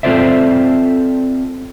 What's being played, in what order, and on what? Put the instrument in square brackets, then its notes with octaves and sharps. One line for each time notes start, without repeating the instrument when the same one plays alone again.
[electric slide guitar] C4 F4 A4 C5 D5 E5